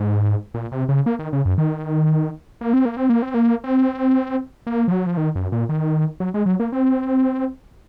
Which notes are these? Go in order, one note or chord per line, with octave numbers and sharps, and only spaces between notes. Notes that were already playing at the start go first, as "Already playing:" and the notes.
Already playing: G#2
A#2
C3
C#3
A#3
D#3
C#3
F#2
D#3
A#3
C4
A#3
C4
A#3
C4
A#3
C4
A#3
F3
F#3
F3
D#3
F#2
A#2
D#3
F#3
G#3
F#3
A#3
C4